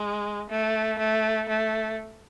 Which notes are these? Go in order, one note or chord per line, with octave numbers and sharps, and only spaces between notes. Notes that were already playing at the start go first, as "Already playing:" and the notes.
Already playing: G#3
A3
A3
A3